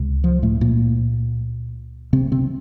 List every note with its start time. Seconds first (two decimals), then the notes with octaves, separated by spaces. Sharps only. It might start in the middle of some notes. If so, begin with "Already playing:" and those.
Already playing: C#2 C3
0.24 F3
0.42 A2 A3
0.61 A#2 A#3
2.13 C3 C4
2.32 C3 C4